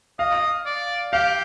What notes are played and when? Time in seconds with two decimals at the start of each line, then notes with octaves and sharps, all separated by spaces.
0.19 D#5 F5
0.66 D5
1.13 G4 F5